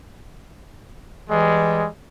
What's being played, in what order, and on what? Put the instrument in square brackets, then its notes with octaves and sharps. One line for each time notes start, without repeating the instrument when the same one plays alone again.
[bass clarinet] E3 [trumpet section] G3 G#3